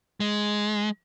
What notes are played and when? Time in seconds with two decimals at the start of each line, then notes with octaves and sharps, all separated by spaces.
0.20 G#3